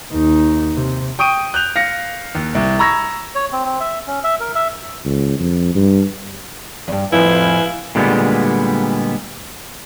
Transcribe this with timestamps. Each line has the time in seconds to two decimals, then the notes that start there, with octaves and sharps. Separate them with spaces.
0.13 D#2 D#4
0.76 C3
1.19 G5 C#6 D#6 D7 D#7
1.54 F#6 G6 F7
1.76 F5 A#6 C#7
2.35 D#2
2.55 C2
2.79 A#5 B5 C#6 E6 G#6 A#6
3.35 C#5
3.52 C4
3.65 C4
3.80 E5
4.07 C#4
4.24 E5
4.40 A#4
4.55 E5
5.05 C#2
5.40 F2
5.75 G2
6.88 E2 G2
7.12 F2 A2 F3 E4 B4 F5 G#5
7.95 A#2 D3 G3 G#3 A#3 B3